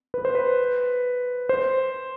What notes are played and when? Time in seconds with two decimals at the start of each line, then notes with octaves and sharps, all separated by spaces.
0.14 B4
0.25 C5
0.35 B4
1.49 C5